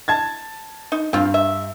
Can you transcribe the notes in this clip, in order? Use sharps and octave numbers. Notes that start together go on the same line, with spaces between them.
A5 G#6 A6
D#4
G2 C4 F4
E5